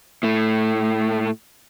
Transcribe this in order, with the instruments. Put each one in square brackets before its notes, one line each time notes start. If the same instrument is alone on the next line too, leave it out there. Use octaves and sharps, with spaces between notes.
[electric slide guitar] A2 A3